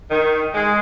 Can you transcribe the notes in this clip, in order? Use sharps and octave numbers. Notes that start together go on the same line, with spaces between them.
D#3
G#3